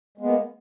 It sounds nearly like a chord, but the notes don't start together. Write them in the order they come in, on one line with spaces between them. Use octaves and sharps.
G#3 B3 A#3